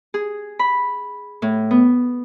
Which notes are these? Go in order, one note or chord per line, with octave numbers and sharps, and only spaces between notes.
G#4
B5
A2
B3